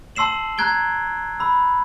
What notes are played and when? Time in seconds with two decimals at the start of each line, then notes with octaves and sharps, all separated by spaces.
0.16 A5 C6 E6 C7 E7 F#7
0.58 A#5 F#6 G#6 D7 G7
1.40 B5 E6